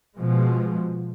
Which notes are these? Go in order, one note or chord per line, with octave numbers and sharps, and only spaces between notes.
B2 F3 G#3